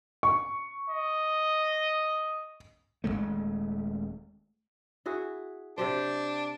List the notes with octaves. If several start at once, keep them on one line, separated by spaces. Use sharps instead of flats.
C#6
D#5
D#1 G#2 G#3 A3
E4 F#4 G#4
C3 D4 G4 C5